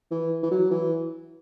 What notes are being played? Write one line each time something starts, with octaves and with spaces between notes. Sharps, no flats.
E3
E3
F#3
E3